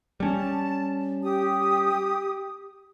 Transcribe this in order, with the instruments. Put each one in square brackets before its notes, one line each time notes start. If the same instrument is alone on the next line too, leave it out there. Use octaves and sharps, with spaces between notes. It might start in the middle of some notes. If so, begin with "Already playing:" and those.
[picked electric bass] G3 C#4 [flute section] A5
[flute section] G4 D#6